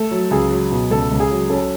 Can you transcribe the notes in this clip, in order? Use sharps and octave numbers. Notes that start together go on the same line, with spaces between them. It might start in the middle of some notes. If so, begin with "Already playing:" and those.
Already playing: A3 A4
F#3
C#2 G#4
F#3
B2
C#2 A4
C#2
G#4
F#3
C#4 A4